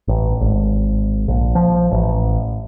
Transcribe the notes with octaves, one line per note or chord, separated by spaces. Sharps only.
A1
G#1
A#1
F3
A1